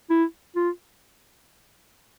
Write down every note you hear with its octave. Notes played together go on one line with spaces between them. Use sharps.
E4
F4